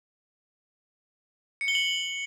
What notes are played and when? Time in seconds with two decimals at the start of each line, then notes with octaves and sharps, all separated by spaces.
1.61 C#7
1.68 G7
1.75 F#7